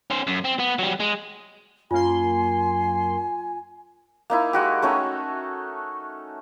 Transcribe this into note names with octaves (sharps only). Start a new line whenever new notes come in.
C#4 C5
F#2
C4
B3
F#3 G3
G#3
F#2 A#3 F4 G#5 C6
A#3 D#4 E4
G#3 F#4 G4
A3 C#4 D#4 F#4